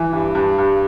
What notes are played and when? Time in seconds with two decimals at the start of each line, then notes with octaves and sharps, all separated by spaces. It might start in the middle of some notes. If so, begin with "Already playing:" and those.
Already playing: E3
0.13 G2
0.35 G2
0.58 G2